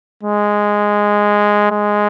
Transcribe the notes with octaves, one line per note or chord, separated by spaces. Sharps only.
G#3
G#3